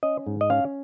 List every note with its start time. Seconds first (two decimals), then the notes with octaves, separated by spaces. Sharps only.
0.03 C#4 D#5
0.27 G#2
0.41 D#5
0.50 C#4 F5